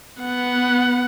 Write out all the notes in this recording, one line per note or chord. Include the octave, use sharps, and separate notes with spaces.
B3 F#5